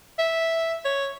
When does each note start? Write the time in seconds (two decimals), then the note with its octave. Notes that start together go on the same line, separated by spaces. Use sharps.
0.19 E5
0.85 C#5